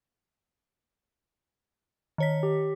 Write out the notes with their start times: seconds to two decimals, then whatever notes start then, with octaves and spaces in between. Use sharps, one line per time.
2.18 D#3 C#5 B6
2.43 G4